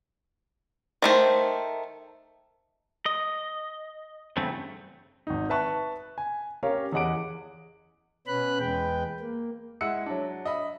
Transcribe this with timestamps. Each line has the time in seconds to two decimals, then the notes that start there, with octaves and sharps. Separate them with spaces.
1.02 D#3 A3 C5
3.06 D#5
4.37 E2 G2 C#3 A3 C4
5.27 G#1 D#4
5.50 B4 E5 A5 C#6 F#6
6.18 G#5
6.63 C#4 G4 A#4 C#5 F5 A#5
6.93 E2 G#4 D#5 F#5 D6 D7
8.27 B2 B3 C#4 B4 B5 F#6
8.60 E2 G#3 B4 G5
9.20 A#3
9.81 G#3 E4 F#5 E6 C#7
10.06 F#3 D4
10.45 D#5 E5 B5